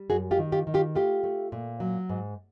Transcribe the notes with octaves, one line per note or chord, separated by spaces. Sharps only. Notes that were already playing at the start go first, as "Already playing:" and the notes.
Already playing: G3
F#2 F#4 G#4
F4 G4
D#3
F4 G4
D#3
F4 G4
A3 F4 G4
A3
A#2
F#3
G#2